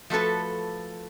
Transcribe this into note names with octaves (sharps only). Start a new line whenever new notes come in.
F3 A3 F#4 A4 B4